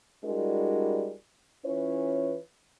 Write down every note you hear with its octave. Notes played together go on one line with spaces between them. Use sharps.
G3 G#3 D4 E4 F#4 A#4
E3 C#4 E4 F4 B4 C#5